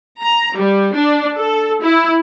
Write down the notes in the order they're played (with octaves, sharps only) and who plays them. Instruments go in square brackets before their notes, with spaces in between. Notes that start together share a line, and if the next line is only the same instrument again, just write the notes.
[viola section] A#5
G3
D4
A4
E4